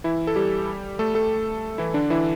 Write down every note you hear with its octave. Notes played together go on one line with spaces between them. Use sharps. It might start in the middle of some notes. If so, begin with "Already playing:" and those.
E3 E4
A4
G3 G4
A3 A4
A3 A4
E3 E4
D3 D4
E3 E4